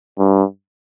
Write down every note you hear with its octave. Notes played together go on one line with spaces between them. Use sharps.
G2